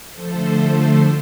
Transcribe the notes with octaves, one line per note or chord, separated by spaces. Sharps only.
D3 F3 A3 A4 C5